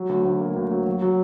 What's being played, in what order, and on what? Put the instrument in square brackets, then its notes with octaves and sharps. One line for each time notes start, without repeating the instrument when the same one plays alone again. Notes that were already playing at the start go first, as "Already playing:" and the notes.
Already playing: [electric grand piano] F#3
D2
D2
A#3
D2
F#3
F#3
F#3